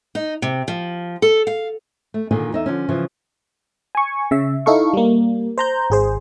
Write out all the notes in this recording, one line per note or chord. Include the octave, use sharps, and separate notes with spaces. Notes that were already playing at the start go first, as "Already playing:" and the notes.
D#4
C3
F3
A4
F5
A3
A#2 D3 D#3 F4 G#4
E2 D#4 E5
D3 F3 C#4
C#3 E3 F3
G#5 C#6
C#3 E5
D#4 E4 A4 F5 C#6
G3 A#3
C5 A#5 G6
G#1 G#4 C5